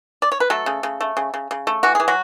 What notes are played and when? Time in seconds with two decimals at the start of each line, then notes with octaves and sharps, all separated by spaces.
0.22 D5
0.32 C#5
0.40 B4
0.50 F#3 A3 A4
0.66 C#3
0.83 C#3
1.01 A3
1.17 C#3
1.34 C#3
1.51 C#3
1.67 A3
1.83 E3 F#4
1.95 E3 G#4
2.08 F#3 F#4